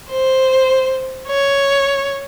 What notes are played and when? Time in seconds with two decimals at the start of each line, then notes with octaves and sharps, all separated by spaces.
0.11 C5
1.28 C#5